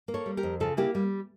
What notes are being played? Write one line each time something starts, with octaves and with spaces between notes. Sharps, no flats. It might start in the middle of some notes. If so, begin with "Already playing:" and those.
A#3
A4 C#5
G3
G4 A#4
F2
C#3 F4 A4
A#3 E4 G4
G3